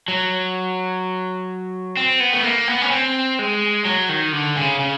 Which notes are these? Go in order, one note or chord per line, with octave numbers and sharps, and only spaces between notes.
F#3
C4
B3
A3
A#3
B3
C#4
C4
G#3
F#3
D#3
D3
C#3
C#3